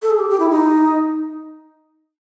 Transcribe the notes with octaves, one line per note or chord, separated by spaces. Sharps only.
A4
G#4
G4
G4
E4
D#4